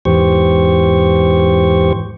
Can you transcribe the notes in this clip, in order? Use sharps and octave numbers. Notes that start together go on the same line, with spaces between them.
E2 G#2 E3 G4 C5 C#6